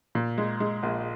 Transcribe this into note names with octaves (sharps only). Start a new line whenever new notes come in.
A#2
G#3
G#3
A#1